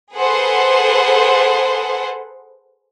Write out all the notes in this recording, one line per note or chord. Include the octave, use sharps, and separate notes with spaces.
G#4 A4 B4 C5 F#5 C6